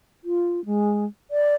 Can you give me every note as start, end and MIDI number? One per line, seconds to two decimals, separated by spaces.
0.24 0.64 65
0.65 1.04 56
1.30 1.54 74